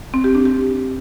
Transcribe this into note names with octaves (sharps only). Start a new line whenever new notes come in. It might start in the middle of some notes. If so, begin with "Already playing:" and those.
C4
G4
D4
G4